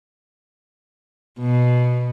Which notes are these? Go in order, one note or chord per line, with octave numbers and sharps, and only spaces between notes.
B2